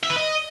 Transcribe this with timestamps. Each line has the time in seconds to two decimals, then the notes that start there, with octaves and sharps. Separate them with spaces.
0.04 E5
0.10 B4
0.16 D#5